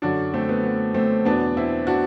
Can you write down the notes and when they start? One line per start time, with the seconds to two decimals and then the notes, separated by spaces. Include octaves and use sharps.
0.02 F#2 D3 F#3 D4 F#4
0.34 A3 C4
0.49 B3
0.64 B3
0.94 A3 C4
1.25 E2 B2 F#3 B3 D4
1.57 C4 E4
1.87 D4 F#4